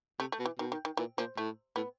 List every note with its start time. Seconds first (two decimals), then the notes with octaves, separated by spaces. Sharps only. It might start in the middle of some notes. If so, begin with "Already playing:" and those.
0.20 C3 A3
0.32 A3
0.39 B2
0.46 E3
0.59 B2 D#3
0.72 D#3
0.85 D#3
0.97 A#2 E3
1.18 A#2 F3
1.37 A2 A3
1.76 A2 B3